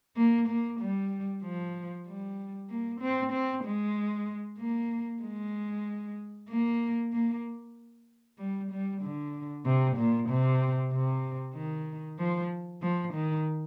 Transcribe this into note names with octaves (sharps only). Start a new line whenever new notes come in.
A#3
A#3
G3
F3
G3
A#3
C4
C4
G#3
A#3
G#3
A#3
A#3
G3
G3
D3
C3
A#2
C3
C3
D#3
F3
F3
D#3